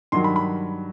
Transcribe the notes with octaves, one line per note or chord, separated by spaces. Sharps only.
G2 D#3 F#3 C6
B5
B5